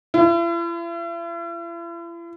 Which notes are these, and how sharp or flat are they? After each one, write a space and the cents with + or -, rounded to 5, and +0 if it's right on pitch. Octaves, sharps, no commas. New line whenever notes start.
E4 +45